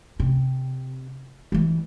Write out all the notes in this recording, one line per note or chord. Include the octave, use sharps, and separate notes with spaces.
C3
E3 G3